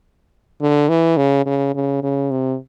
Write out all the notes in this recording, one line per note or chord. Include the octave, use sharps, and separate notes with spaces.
D3
E3
C#3
C#3
C#3
C#3
C3